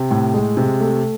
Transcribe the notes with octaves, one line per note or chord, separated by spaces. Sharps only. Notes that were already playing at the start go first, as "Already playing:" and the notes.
Already playing: C3
A2
G#3
C3
A3